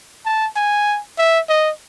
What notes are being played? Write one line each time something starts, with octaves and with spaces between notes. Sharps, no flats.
A5
G#5
E5
D#5